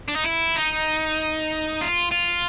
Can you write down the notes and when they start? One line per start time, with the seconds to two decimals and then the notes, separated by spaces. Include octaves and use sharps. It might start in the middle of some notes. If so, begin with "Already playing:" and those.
0.08 D4
0.16 D#4
0.24 E4
0.56 D#4
1.81 F4
2.12 F4